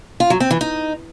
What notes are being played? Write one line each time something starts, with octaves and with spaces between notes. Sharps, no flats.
F4
F#3
C4
E3
D#4